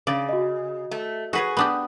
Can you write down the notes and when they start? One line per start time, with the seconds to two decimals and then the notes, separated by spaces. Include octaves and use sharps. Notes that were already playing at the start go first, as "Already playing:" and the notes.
0.07 C#3 D5
0.29 F#4 D#5
0.91 A3
1.33 F#4 G#4 B4 C#5
1.57 B3 D4 G4 B5 D#6